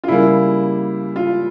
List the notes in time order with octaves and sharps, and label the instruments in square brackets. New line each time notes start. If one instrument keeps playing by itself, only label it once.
[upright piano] F4
C#3 G3 A#3 E4
F4